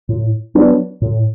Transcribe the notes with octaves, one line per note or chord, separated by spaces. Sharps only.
A2
F#3 B3 D4
A2